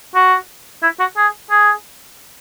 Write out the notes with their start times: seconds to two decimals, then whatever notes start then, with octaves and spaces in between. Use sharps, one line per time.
0.15 F#4
0.83 E4
1.00 F#4
1.17 G#4
1.51 G#4